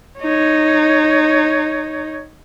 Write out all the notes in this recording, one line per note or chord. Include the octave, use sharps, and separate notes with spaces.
D#4 C#5